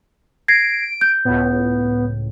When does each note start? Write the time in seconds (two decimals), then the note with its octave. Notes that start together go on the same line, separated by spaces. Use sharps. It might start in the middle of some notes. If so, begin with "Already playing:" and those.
0.48 G#6 A#6 C7 D7
1.01 G6
1.25 C#2 A2 B3